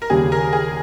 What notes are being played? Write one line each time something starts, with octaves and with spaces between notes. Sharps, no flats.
A#4
D#2 C#3 G3 G#4
A#4
G#4